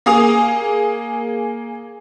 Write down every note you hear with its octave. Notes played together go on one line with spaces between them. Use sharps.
A#3 G#4 D#6 F7